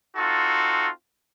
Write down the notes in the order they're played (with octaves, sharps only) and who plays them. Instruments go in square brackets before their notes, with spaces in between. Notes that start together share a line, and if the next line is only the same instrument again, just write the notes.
[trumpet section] C4 D#4 F4 F#4 A4